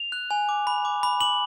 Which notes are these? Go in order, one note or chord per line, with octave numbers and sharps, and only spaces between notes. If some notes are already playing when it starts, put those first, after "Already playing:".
Already playing: F7
F#6
G#5
D6
B5
D6
B5
D6 F#7